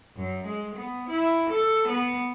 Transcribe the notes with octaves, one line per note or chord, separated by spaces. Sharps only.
F#2
G#3
B3
E4
A4
B3